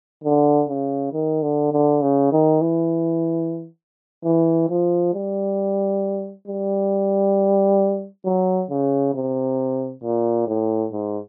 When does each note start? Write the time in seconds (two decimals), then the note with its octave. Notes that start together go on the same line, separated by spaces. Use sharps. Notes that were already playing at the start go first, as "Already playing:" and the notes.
0.24 D3
0.69 C#3
1.13 D#3
1.42 D3
1.72 D3
2.02 C#3
2.32 D#3
2.61 E3
4.24 E3
4.69 F3
5.13 G3
6.47 G3
8.25 F#3
8.70 C#3
9.14 C3
10.03 A#2
10.47 A2
10.92 G#2